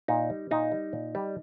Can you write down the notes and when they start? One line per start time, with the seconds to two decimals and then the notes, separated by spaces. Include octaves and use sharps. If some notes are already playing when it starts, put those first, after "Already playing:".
0.08 A#2 D#4
0.30 G3
0.51 A#2 D#4
0.72 G3
0.93 A#2
1.15 G3